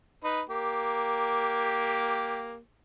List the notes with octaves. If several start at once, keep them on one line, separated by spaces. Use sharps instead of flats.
D#4 B4
A#3 G4